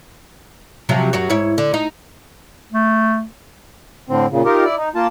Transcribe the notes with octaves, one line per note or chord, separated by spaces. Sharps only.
C3 F3 F#3
F#2 F#3 F#4
G#2 E4 C#5
D3
D#4
A3
A2 D3 C4
A#2 C#3
D#4 F4 G4 A#4
E4 D5
D#4
A#3 F4 A5